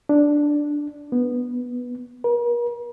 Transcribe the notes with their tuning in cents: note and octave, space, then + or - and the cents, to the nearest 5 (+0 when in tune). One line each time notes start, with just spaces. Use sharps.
D4 +0
B3 -5
A#4 +45